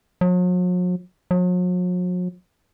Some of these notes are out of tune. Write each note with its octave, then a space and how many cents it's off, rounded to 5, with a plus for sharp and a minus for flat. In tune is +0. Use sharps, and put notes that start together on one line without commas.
F#3 -45
F#3 -45